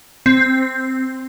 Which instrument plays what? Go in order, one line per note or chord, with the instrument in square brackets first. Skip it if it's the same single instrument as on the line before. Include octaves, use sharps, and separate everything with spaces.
[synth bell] C4